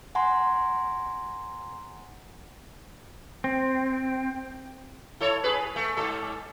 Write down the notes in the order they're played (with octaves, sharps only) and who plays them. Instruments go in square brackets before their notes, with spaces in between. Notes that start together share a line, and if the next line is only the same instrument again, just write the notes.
[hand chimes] F#5 G#5 A#5 C6
[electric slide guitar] C4
[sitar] E4 A4 C#5
G#4 B4
A3
G#2 A4